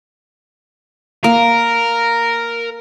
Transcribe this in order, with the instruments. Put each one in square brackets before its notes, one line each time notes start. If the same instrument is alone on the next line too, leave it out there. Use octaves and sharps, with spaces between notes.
[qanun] A#3 [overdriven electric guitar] A#4